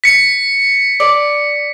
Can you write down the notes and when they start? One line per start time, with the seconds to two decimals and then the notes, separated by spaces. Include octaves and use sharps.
0.04 B6 C#7
1.00 D5